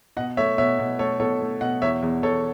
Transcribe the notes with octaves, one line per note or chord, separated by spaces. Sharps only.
B2 D#5 F#5
A3 C#5 E5
B2 C#5 E5
B2
A3 A4 C#5
B2 A4 C#5
A3
B2 D#5 F#5
E2 C#5 E5
E2
E2 A4 C#5